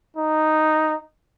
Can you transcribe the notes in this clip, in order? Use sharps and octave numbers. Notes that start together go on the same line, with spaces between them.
D#4